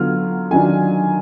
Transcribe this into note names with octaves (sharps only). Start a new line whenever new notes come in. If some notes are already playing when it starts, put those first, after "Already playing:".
Already playing: D3 F#3 B3 F4 F6
D#3 F#3 D4 F4 G#5